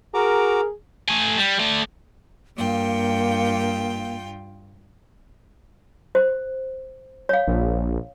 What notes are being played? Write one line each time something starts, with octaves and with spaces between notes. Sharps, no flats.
F#4 G#4 A#4 A#5 D6
A3 G#5
G3
A3 D5
G2 A#3 F4 G5
C5
C#5 F5
A#1